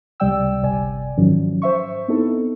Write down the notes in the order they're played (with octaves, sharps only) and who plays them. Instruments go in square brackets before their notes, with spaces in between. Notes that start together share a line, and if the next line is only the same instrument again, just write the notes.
[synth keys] C#2 C3 G3 D5 G5 E6
G1 C3 D5 G#5
G#2 D#3 F3 F#3 C#4
C5 E5 C#6
B3 C4 D#4 E4 A4